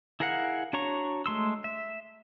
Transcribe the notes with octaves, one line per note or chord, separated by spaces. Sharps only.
E4 G#4 A#4 F5 F#5
D4 F#4 C#5 A#5 C#6
G#3 A3 C6 E6
E5